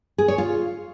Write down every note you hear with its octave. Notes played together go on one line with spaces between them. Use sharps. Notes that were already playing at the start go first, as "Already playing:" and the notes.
G#4
C#5
F4